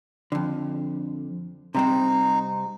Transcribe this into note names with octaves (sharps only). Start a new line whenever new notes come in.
F2 D3
C3 G3 C4 D#4